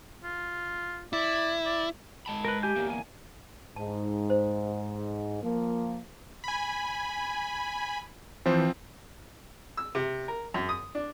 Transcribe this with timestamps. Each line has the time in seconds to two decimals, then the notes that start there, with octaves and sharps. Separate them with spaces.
0.23 F4
1.13 E4 D5
1.66 D5
2.26 G#3 A5 B5
2.45 A#4 B4
2.63 G4 G#5 G6
2.76 E2 A#3
2.90 G#5
3.76 G#2 A5
4.30 C5
5.42 F3 A#3
6.44 G#5 B5
8.46 E3 F3 C4 C5
9.77 E6
9.95 C3
10.28 A#4
10.54 F#2
10.69 D#6
10.95 D4